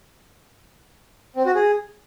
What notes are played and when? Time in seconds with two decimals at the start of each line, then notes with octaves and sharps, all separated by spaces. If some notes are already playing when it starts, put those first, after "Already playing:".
1.36 C4
1.46 F#4
1.55 G#4